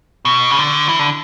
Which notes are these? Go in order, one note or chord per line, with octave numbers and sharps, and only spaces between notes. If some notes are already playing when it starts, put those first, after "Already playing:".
B2
C#3
D3
E3
D3